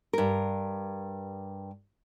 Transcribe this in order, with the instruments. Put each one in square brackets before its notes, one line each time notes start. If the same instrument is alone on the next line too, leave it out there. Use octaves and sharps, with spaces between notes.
[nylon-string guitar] G2 A#4